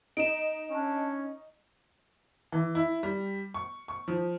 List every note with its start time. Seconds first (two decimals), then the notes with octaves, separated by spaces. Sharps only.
0.17 D#4 D7 E7
0.71 C#4 D4
2.52 E3
2.75 E4
3.03 G3
3.54 C#6
3.88 C#6
4.08 F3